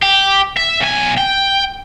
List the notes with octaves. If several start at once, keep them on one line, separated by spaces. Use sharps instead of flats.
G4
E5
B1 G#5
G5